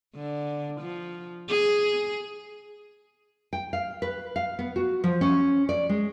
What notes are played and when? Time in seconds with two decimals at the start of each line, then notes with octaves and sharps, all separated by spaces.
0.15 D3
0.81 F3
1.49 G#4
3.53 G5
3.73 F5
4.02 B4
4.36 F5
4.59 B3
4.76 F#4
5.04 F3
5.21 C#4
5.69 D5
5.89 G#3